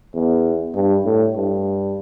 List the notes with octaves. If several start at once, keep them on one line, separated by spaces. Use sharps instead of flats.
E2
G2
A2
G2